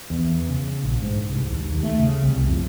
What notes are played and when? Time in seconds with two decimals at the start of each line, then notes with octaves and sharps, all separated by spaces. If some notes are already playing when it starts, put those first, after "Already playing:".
0.10 E2
0.49 C#3
0.83 A#1
1.02 G#2
1.30 C2
1.47 D#2
1.64 D#2
1.83 A3
1.99 C#3
2.22 C2
2.47 F2